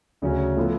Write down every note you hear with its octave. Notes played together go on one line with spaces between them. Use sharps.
D2 C#3 F#3 C#4 F#4
A2 F3 B3 F4 A4